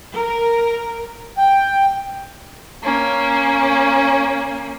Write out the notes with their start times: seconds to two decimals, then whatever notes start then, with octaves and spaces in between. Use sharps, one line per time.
0.14 A#4
1.38 G5
2.83 A#3 C#4